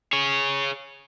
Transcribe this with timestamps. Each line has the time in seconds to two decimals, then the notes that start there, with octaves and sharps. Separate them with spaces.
0.13 G#4 C#5